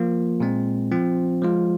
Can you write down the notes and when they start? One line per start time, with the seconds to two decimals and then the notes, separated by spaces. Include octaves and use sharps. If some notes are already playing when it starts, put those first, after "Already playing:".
Already playing: F3 A#3 F4
0.40 A#2 G#3 C4
0.92 F3 C4 F4
1.42 F3 G#3 F4